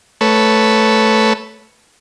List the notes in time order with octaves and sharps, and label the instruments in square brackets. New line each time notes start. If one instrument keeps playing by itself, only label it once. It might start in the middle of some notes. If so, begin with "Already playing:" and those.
[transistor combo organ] A3 A4 B4 C#5